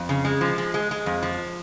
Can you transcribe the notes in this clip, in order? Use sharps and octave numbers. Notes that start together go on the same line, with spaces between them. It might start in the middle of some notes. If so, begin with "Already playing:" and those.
Already playing: F2
C#3
G#3
F3
G#3
G#3
G#3
F2
F3